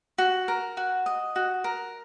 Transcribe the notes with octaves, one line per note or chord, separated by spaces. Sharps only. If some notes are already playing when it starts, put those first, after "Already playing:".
F#4
A#4
F#4
D#5
F#4
A#4